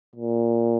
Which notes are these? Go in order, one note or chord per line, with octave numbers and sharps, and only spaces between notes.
A#2